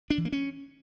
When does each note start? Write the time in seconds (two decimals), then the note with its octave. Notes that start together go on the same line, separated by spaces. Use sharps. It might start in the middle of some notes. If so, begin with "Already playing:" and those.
0.10 D4
0.18 E3
0.25 A#3
0.32 C#4